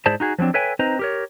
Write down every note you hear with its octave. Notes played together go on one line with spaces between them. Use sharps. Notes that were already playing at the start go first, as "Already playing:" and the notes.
G#2 E4 G#4 C5 D5 A5
D#4 F#4 G#4
F3 F#3 A#3 C4 D4
A4 B4 C#5 E5 G5 G#5
C4 D#4 B4 C5 D#5 A#5
G4 A#4 C#5